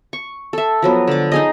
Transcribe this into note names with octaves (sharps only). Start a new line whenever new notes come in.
C#6
A4 E5
F3 F#3 B3
D3 D6
D#4 G#4 D#5